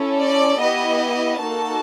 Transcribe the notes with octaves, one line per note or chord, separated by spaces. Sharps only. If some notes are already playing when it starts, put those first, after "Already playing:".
Already playing: C#4 E4 A4
D5
B3 E4 G4 D#5
A#3 D#4 F#4 A4 A5